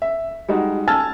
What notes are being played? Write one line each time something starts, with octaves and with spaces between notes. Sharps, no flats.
E5
G3 G#3 D#4 F#4
G#5 A5 E6 F6 G#6 A6